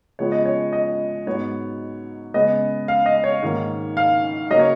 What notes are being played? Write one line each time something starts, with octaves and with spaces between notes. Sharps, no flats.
C#3 F3 G#3 B3 C#5
D#5
C#5
D#5
G#2 F#3 B3 C#5
C#3 G#3 B3 D#5
F5
D#5
C#5
G#2 D#3 A#3
F5
C#3 F#3 A#3 D#5
C#5